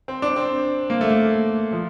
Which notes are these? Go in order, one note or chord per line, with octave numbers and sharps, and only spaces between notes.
C4
D4
C4
A#3
A3
A#3
F3